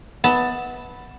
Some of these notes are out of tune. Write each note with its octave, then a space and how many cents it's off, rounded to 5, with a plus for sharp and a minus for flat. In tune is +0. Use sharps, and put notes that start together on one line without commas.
B3 +0 E5 -30 A5 +10